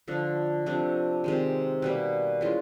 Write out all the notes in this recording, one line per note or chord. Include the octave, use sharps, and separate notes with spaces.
D3 F3 A3 D4
C3 F3 A3 D4
C3 D#3 G#3
B2 G3 A#3
E3 G#3 C#4 F4